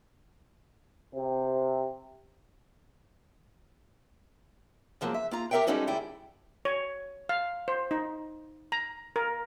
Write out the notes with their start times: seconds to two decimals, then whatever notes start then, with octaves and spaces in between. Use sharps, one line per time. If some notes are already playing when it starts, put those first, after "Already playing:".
1.15 C3
5.01 F#2 F3 F#3 G#3 A#3
5.14 E5
5.31 A#3 F4 A#5
5.51 G4 A#4 B4 E5 F#5 G5
5.67 G3 G#3 C#4 D#4 F#4 A4
5.87 D2 G#2 G3 E4 G5
6.65 C#5
7.29 F5
7.68 C5
7.91 D#4
8.72 A#5
9.16 A#4